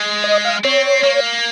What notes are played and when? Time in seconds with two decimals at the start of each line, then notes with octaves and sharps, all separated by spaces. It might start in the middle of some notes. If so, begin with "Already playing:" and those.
Already playing: G#3
0.24 D#5
0.45 F5
0.64 C4 C#5
1.03 A#3